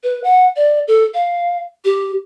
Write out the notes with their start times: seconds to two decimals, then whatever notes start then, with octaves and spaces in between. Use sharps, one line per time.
0.03 B4
0.24 F#5
0.56 D5
0.88 A4
1.14 F5
1.85 G4